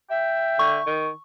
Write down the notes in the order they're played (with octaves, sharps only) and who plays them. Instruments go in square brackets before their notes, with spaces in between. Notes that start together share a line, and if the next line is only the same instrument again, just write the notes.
[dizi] E5 [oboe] G5
[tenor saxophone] D3 [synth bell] C#6
[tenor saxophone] D#3